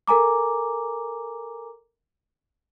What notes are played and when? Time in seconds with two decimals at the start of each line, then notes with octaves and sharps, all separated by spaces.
0.07 A4 A#4 G#5 A#5 D6